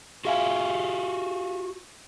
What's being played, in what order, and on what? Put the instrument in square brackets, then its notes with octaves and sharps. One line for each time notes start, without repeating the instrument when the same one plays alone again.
[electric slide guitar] F4 F#4 E5 [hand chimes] G#4 F5 G#5